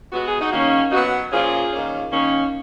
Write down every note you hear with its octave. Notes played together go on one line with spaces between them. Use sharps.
B2 G#3 B3 F#4
G#4
D#4 F#4
D#3 A#3 C#4
B2 F#3 B3 D#4 F#4
A#2 F3 A#3 C#4 F4 G#4
D#3 A#3 C#4
D#3 A#3 C#4